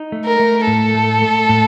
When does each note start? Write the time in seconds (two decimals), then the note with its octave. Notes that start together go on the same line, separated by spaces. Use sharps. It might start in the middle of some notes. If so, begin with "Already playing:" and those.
Already playing: D#4
0.12 A3
0.25 A#4
0.40 A3
0.66 A2 A4
0.95 A3
1.22 A3
1.49 A2